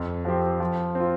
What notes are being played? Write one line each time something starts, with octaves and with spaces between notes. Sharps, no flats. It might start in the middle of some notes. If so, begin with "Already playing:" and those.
Already playing: F2
F3 C4 G4 C5
F3
C4
F4